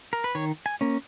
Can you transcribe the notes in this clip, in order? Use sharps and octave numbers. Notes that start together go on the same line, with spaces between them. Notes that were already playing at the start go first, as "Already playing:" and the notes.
A#4
B4
D#3 C#5
G#5
A#3 C#4